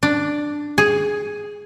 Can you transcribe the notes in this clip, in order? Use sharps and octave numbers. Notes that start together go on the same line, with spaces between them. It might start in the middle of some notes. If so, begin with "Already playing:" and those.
D4
G#4